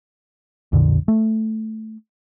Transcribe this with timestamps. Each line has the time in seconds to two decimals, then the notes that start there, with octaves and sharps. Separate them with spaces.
0.72 B1 F2 A#2 D3
1.08 A3